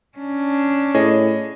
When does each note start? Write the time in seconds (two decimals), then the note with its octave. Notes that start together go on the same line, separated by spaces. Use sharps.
0.18 C#4 D4
0.94 A2 G#4 C#5 D#5